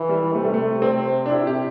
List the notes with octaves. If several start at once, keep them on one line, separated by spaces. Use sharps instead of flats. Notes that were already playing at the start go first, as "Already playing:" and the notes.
Already playing: E3
G3
C3 A3
G3
A3
C4
D4
C3 E4
G4